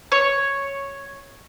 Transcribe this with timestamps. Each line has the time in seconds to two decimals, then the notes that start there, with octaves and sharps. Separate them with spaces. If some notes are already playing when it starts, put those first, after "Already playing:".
0.12 C#5